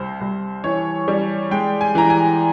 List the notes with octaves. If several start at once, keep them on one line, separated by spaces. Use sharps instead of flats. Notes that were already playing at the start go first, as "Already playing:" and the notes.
Already playing: C2 C5
C2
E3 C#5
G3
G#3 G5
G#5
E3 A#5
G#5